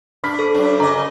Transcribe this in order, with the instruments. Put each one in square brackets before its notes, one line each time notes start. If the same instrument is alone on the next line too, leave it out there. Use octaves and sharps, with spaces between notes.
[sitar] D4 [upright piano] B5 F6 B6
[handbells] A4 C5
[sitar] F#2 D4
[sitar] C#3 D#5 [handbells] A#5 D6